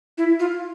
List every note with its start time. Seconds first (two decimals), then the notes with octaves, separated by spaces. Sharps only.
0.18 E4
0.40 F4